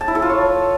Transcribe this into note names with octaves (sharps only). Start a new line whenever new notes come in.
A5
E4
A4
F4
C#5